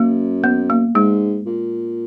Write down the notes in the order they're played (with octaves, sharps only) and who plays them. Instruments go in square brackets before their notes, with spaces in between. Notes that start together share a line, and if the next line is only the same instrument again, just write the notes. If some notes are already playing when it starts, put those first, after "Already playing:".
Already playing: [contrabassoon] F#2 [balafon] A#3
[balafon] B3
A#3
[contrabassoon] G#2 [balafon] G#3
[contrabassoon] A#2